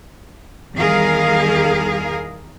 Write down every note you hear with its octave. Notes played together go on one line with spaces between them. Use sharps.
E2 D#3 G3 G#4 A#4 F5